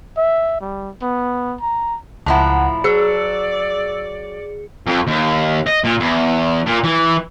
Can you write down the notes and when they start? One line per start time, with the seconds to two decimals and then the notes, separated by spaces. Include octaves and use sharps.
0.17 E5
0.61 G3
1.02 B3
1.61 A#5
2.26 C#2 A2 F3 E4 F#5 A5 A#5
2.84 F#3 G#4 D5 E6 C#7
4.86 F2
5.07 D#2
5.67 D#5
5.84 A#2
6.00 E2
6.66 A#2
6.84 E3